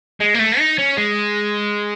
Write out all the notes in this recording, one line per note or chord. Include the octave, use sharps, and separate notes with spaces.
G#3
A#3
A3
D#4
C#4
G#3